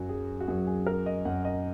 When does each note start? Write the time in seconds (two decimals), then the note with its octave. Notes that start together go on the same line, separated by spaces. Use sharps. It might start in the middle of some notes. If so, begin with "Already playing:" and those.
Already playing: F#2 F#3 F#4
0.09 G#4
0.40 F#4
0.48 F#2 F#3 G#4
0.67 G#4
0.87 A#4
1.06 D#5
1.25 F#2 F#3 F#5
1.45 D#5